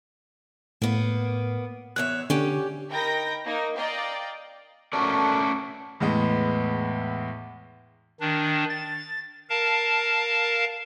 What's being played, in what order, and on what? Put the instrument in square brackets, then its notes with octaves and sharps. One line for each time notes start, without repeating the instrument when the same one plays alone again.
[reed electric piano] A2 [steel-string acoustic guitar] A#3 B3
[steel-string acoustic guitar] E2 C#5 E5 [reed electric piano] F#6
[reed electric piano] D3 [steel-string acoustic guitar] C#4 G4
[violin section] D#4 A#4 G5 B5 G6 A#6
A#3 D#4 A#4
D5 D#5 F5 G5 A#5
[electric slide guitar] A3 C#4 D5 [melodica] F#4 A4 A#4
[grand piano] E2 A2 G#3 B3
[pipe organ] D#3 D4
A6
A#4 F5 A5